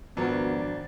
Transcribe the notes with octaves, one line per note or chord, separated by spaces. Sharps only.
G#1 F2 B3 D4 F#4 A#4